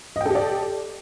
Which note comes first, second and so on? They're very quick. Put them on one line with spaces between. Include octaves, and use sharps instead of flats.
D#5 G5 A4 G4 D5